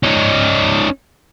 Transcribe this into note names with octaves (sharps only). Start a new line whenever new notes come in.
C#4 D#4